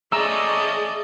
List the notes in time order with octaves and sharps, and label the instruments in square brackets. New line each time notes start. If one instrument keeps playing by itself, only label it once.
[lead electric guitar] A3 C#4 [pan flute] G#4 [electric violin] D5 D#5 [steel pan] A#5 E6